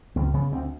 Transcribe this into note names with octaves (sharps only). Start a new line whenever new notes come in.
C#2 B3
C#3 B3
D2 C4